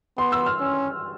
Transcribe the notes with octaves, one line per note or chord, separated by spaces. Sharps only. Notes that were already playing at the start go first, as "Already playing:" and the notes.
B3 C6
E6
F6
C#4